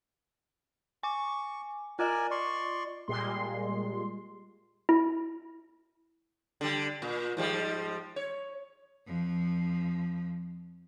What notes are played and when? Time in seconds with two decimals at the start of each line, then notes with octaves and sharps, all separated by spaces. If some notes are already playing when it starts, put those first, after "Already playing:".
1.03 G#5 C#6 D6
1.99 F4 A#4 D5 D#5 G#5
2.31 D5 C6 C#6
3.08 A#2 G3 G#3 C6
4.89 E4
6.61 D3 G3
7.02 A#2
7.37 G#2 F3 G3
8.16 C#5
9.06 F2 F3